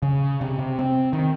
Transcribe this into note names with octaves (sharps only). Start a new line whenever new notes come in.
C#3
C3
C3
C4
D#3